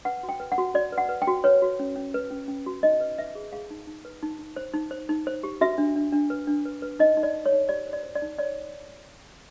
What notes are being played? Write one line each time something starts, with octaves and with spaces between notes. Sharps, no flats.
B4 F#5
F#4
G5
B4
F#5
F#4
F#4 D5
B4
F#5
B4
G5
F#4
B4 C#5
F#4
C#4
C#4
B4
C#4
C#4
F#4
D#4 D#5
B4
B4 E5
G#4
G#4 F5
D#4
D#4
B4
D#4
D#4
C5
D#4
C5
D#4
C5
G4
F#4 E5
D4
D4
D4
B4
D4
B4
B4
D#4 D#5
D#4
D5
D#4
C#5
D#4
G4 D5
C5
D5
C5
D5
D#4
C#5 D5